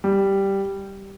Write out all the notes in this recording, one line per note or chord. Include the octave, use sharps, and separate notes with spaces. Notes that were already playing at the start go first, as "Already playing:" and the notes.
G3